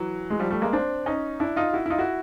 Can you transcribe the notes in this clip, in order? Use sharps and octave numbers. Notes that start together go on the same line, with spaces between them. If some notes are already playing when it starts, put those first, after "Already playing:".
Already playing: E3 F#3
G#3
F3 G3
G3 A3
G#3 A#3
C4 D4
C#4 D#4
D4 E4
D#4 F4
E4 F#4
E4
D#4 F4
E4 F#4